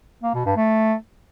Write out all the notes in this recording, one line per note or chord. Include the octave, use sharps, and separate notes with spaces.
A#3
B2
G2
A3